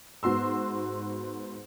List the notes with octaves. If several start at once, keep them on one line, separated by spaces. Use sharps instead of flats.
G#2 B3 F#4 C6 E6